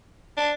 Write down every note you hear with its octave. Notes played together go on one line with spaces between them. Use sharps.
D4